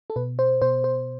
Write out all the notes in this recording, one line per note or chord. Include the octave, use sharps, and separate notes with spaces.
A4
B2 B4
C5
B2 C5
C5